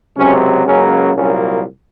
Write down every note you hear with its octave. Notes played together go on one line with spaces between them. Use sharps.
C#2 C3 F#3 C#4
C#2 C#3 F#3 A#3 C#4
C2 A#2 F#3 A#3 C#4